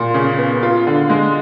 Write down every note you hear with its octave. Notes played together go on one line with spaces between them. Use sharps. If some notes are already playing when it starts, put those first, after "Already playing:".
Already playing: A#2
C#3
B3
F4
D3
G#3